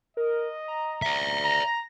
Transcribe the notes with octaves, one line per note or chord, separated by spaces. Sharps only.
A#4 D#5
A#5
D5 E5
A#5 A#6